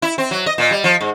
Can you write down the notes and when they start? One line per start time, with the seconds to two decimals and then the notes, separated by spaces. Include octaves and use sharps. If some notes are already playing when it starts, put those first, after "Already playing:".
0.02 E4
0.18 C4
0.31 F#3
0.46 D#5
0.58 A#2
0.71 G3
0.84 F3
1.01 G#2